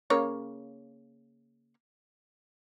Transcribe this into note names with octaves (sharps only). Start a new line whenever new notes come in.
C#3 A#3 C#5